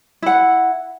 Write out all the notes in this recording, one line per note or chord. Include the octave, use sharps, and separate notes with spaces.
E4 F#5